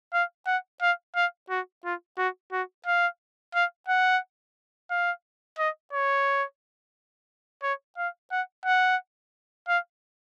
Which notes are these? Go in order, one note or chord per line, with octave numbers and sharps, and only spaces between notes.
F5
F#5
F5
F5
F#4
F4
F#4
F#4
F5
F5
F#5
F5
D#5
C#5
C#5
F5
F#5
F#5
F5